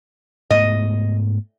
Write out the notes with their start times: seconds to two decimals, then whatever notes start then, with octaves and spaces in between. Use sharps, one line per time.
0.50 G#2 A3 B3 D#5